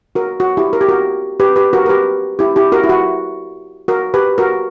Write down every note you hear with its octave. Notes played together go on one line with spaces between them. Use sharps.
F#4 A#4
F#4
E4 G4
A#4
G4
F#4 A#4
G4 B4
G4 B4
F#4 A#4
A#4
G4 B4
E4 G4
E4 G4
F#4 A#4
E4
F#4
F#4 A#4
G4 B4
F#4 A#4